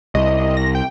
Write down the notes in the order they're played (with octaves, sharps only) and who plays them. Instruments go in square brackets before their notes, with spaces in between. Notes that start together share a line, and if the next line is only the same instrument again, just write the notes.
[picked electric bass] C2 [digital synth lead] D#5
[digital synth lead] A#6
G5